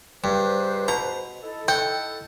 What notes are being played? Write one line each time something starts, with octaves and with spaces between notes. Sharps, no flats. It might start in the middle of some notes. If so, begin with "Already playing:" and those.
C#2 G2 B4 C5
B2 A#5
D#4 E4 A4
F#5 G5